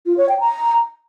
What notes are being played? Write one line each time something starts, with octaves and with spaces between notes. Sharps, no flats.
F4
C#5
G5
A#5